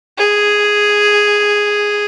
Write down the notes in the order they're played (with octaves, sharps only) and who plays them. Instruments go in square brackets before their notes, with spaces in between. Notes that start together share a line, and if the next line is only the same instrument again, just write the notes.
[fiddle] G#4